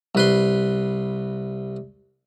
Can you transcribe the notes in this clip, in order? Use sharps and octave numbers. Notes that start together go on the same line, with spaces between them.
C2 B4 C6